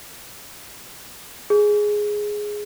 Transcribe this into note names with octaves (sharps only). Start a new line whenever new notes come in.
G#4